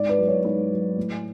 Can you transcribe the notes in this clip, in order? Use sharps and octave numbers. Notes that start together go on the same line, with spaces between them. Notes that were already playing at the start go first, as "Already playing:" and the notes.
Already playing: G#2 D5
B4
F#3
C#5
G#2 B4
F#3
A2